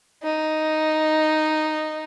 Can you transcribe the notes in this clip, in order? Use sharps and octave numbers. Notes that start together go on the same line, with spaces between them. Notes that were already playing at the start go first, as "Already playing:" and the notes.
D#4